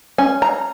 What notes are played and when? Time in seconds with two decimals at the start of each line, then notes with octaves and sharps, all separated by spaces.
0.18 C#4 G#5
0.42 A#5